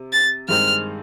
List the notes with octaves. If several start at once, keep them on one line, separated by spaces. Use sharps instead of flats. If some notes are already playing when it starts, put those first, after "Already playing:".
Already playing: C3
A6
G2 D#3 G#3 C4 D#4 F6